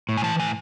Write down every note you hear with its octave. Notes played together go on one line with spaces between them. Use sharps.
A2
G#5
E3 A5
A2 G#5